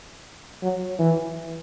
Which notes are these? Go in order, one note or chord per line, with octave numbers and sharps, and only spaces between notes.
F#3
E3